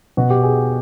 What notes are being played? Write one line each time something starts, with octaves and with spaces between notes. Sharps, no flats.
B2 F#4
G4
G#4